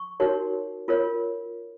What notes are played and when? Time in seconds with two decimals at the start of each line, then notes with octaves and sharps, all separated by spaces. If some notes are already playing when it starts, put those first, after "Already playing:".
Already playing: C#6
0.20 D#4 F#4 A#4 C#5
0.88 F4 A#4 C#5